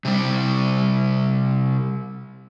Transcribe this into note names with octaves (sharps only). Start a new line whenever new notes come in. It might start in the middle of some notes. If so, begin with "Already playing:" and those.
C3 G3